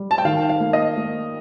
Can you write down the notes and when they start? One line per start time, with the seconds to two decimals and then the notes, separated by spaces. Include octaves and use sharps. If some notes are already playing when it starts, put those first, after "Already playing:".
Already playing: G3
0.11 A5
0.18 G5
0.25 D#3 F5
0.49 F5
0.60 A#3
0.73 D#5
0.97 A#3